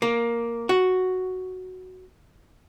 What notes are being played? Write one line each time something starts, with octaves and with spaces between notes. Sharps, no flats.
A#3
F#4